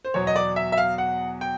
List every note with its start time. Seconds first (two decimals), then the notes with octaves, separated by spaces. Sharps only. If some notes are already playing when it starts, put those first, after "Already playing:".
0.05 C5
0.14 E2 B2 F#3 C#5
0.27 D#5
0.36 D5
0.56 E5
0.72 E5
0.78 F5
0.98 F#5
1.41 G5